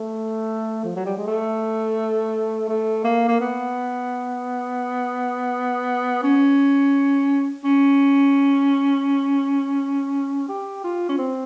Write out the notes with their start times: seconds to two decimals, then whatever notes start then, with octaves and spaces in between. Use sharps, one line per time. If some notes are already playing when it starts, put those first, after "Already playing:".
Already playing: A3
0.84 F3
0.96 F#3
1.06 G3
1.17 G#3
1.27 A3
2.69 A3
3.04 A#3
3.28 A#3
3.41 B3
6.23 C#4
7.64 C#4
10.49 G4
10.84 F4
11.09 C#4
11.18 C4